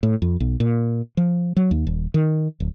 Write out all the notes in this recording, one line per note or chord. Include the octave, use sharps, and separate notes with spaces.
A2
F2
B1
A#2
F3
F#3
D#2
D#1
D#3
D1